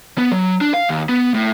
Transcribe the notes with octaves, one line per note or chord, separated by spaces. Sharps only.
B3
F#3
D4
F5
D#2
B3
A2